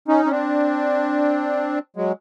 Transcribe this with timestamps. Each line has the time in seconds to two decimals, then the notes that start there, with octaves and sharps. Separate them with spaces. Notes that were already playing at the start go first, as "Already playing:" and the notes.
0.08 C#4 D#4
0.25 C#4
0.31 C4 D4
1.96 F#3 G#3